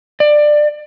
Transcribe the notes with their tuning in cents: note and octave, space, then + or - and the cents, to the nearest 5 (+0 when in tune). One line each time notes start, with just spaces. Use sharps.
D5 +15